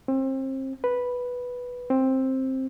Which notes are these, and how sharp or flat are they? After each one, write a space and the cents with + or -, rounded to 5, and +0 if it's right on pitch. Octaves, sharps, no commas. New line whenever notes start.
C4 +30
B4 -5
C4 +10